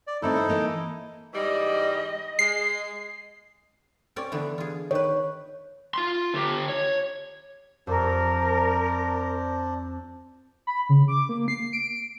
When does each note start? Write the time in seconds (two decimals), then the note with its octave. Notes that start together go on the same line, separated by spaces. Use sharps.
0.07 D5
0.22 G2 A3 C4 D#4 E4 A4
0.36 C5
0.49 E3 A#3 D#5
1.34 G#2 E3 G3 D#5
2.39 G#3 C7
4.16 C4 C#4 D5
4.32 D3 E3 B3
4.58 F4 G#4
4.91 D#3 B4 C#5
5.94 F4 C6
6.34 D3 G4
6.69 C#5
7.87 F2 D4 A#4 C5 D5
10.67 B5
10.89 C#3
11.08 D6
11.29 A#3
11.48 C7
11.73 D7